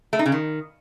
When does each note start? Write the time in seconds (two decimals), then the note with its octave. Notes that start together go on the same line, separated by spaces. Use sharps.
0.13 A3
0.19 D#4
0.26 C#3
0.32 D#3